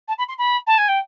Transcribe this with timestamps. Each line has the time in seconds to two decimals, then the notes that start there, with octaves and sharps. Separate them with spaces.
0.08 A5
0.18 B5
0.28 C6
0.38 B5
0.67 A5
0.78 G#5
0.88 G5